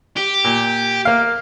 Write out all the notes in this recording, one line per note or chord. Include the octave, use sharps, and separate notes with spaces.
G4
A#2
A#3 F5